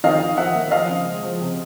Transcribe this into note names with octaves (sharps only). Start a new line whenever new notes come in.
D#3 D#5 F5
D#3
D#3 E5 F#5
A#3
F3 D#5 F5
C#3
G#3
F3
C3